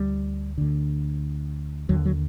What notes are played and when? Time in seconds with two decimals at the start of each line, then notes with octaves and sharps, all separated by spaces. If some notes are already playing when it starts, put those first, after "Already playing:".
Already playing: D2 D3 G3
0.58 D2 D3
1.89 D#2 D3 F#3
2.05 F#3